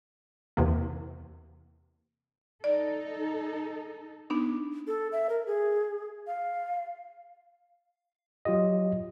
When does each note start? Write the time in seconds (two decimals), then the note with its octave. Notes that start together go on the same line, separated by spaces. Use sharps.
0.57 E2 C3 A#3
2.64 D#4 A4 D5
4.30 B3 D4 D#4
4.87 A4
5.12 E5
5.29 A#4
5.47 G#4
6.27 F5
8.45 F#3 F4 G4 D#5